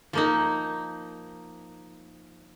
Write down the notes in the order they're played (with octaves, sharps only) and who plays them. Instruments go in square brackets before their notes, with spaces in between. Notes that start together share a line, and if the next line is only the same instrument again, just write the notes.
[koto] F3 A#3 D#4